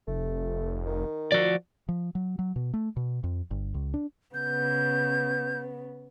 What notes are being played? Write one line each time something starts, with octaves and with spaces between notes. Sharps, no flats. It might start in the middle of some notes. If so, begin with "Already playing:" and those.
F1 A3
D#3
F3 F#4 D5
F3
F#3
F#3
B2
A3
B2
F2
G1
C#2
D4
C#3 B3 G6